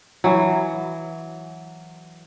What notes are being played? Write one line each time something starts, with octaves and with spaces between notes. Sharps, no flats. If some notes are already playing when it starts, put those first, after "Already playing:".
E3 F#3